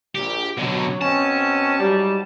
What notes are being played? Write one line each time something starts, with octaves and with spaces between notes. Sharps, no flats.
A#1 G4
B2 D3 F#3
B2 C4 C#4 A5
G#2 F#3 G3